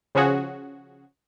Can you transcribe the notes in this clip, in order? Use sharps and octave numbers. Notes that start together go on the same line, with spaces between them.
C#3 F3 C#4 F#4 G#4